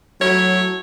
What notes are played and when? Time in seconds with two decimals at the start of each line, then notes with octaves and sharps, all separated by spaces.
0.21 F#3 A3 E4 C#5